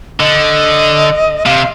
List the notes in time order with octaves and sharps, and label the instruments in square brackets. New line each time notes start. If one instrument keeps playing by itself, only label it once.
[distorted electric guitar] D3 [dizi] D#5
[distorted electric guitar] C3 [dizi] F5